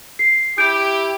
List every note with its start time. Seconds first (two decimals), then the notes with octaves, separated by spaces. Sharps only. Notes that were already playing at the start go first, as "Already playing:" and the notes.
0.19 C7
0.58 E4 G4 G6 D7